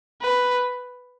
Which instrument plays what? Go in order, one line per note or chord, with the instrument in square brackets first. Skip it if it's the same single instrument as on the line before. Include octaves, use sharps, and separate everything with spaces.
[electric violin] B4